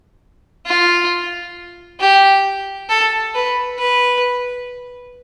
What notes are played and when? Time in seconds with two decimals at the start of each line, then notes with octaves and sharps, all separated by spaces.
0.66 F4
2.01 G4
2.89 A4
3.35 B4
3.79 B4